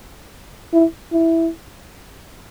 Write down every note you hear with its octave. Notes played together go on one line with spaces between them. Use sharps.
E4
E4